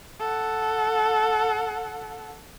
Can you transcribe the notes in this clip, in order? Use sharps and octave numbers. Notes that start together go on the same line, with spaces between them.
A4 F#5